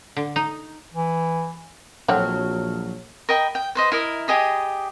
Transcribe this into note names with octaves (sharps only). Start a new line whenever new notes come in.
D3
D#4
E3
A#1 D3 F#3 C4 F#5 A5 F6
A#4 D#5 G5 B5
G5
B4 C5 D#5
E4 A#4 D#5
G4 G#4 D#5 B5